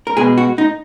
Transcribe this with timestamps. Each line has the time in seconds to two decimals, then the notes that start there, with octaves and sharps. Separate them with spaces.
0.07 A#4
0.17 B2 G#3 G#4
0.38 F#4
0.58 D#4